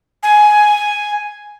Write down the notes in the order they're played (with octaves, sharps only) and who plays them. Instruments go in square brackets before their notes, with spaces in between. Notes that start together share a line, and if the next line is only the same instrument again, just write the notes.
[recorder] G#5